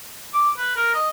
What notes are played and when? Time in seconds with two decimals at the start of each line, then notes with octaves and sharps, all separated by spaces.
0.33 D6
0.57 B4
0.76 A#4
0.94 D#5